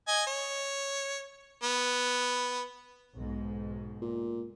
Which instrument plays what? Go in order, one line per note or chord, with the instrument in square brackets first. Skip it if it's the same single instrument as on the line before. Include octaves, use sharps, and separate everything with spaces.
[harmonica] D#5 G#5
C#5
B3
[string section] B1 G#2
[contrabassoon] A#2